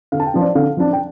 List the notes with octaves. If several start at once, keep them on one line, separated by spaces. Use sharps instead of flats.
D3 F5
A5
G5
F3 D4
D5
D3 F5
F3 D4
G5